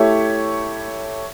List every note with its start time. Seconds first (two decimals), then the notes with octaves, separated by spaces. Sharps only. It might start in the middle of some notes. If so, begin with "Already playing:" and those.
Already playing: A3 E4 G4 C#5 E5